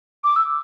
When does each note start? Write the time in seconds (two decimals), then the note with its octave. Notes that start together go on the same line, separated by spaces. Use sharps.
0.24 D6
0.36 E6